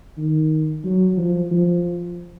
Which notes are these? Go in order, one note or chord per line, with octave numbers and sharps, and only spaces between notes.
D#3
F#3
F3
F3